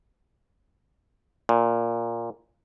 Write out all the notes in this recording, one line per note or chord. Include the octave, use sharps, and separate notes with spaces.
A#2